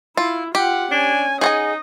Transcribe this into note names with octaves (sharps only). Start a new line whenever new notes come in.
E4 F4
F4 G4 F#5
C#4 D4 G#5
D#4 G#4 D#5 F#5 G#5